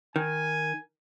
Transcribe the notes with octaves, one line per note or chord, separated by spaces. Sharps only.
D#3 G#5